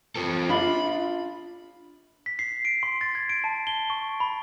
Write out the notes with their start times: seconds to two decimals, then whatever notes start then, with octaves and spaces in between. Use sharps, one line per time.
0.16 F4 A4
0.50 D4 F4 B5
2.26 B6
2.39 C7
2.65 D7
2.83 C6
3.01 A6
3.15 G#6
3.29 D7
3.44 A5
3.67 G7
3.90 C#6
4.20 B5